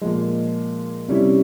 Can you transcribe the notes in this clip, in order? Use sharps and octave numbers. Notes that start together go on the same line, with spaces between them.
A#2 F3 G#3
C3 G3 C#4 E4